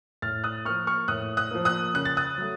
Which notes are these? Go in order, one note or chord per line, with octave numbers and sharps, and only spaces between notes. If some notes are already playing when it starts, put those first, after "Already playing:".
A2 F6 A6
D#6 F#6
F3 A#3 C#6 F6
C#6 F6
A2 D#6 F#6
D#6 F#6
F3 A#3
D#6 F#6
C#3 F#6
A6
D#6 F#6
F#3 A3